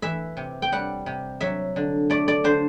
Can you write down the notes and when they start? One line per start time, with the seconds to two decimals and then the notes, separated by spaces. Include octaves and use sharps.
0.02 E3 E5
0.37 C3
0.62 G5
0.72 G3 F#5
1.06 C3
1.40 F#3 E5
1.76 D3
2.10 A3 D5
2.28 D5
2.44 D3 C5